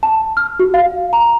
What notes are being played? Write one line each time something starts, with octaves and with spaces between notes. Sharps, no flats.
A5
F6
F#4
F5
A#5